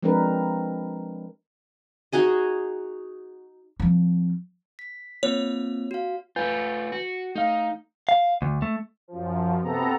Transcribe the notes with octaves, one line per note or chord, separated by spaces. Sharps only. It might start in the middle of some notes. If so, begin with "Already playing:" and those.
F3 G#3 C4 D4 A#4 B4
D#4 F#4 G#4 D#5
F3 C4
B6
A#3 C4 F4 C#5
F#4 F5
A3 F4 B4 G#5 G6
F#4
A3 D#4 F5
F5
D2
A3
F#2 F3
C3 B3 A4 A#5